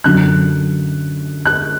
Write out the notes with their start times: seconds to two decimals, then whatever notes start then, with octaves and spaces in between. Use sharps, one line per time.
0.04 F#2 D3 F#3 F#6
1.45 F#6